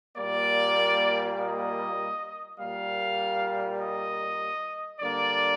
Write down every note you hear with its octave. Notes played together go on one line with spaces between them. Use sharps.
A#2 G3 A#3 D5
D#5
A#2 G3 A#3 F5
D#5
D3 G3 A#3 D5